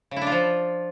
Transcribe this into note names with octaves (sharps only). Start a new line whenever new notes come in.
C#3
E4
D4
F4
F3